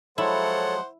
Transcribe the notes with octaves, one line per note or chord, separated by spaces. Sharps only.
F3 F#3 G#3 E4 A4 C5 C#5 F#5